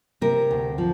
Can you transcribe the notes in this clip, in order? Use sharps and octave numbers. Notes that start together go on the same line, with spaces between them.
C3 A#4
D2
F3